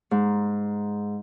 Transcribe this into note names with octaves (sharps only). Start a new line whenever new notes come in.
G#2